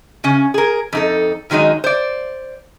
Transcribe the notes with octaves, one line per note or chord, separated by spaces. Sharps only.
C#3 C#4
G#4 A#4
F2 D#4 A4
F#2 D#3 F#3 G#3 D#4
C5 D5